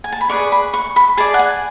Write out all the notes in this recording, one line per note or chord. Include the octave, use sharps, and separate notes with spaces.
G#5
A5
B5
G#4 B4 D5 C#6
B5
C#6
B5
G#4 D5 A5
F#5
G#5